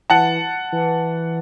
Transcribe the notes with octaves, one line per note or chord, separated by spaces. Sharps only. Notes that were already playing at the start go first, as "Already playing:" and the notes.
E3 F#5 A5
E3